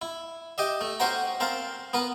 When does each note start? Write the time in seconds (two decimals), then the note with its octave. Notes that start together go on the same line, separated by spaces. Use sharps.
0.02 E4
0.58 G4 D#5 E5
0.81 A3
1.00 C#4 F#4 C5 F#5 G5 A#5
1.40 C4 A#4 F5 A5
1.93 B3 A#4 B4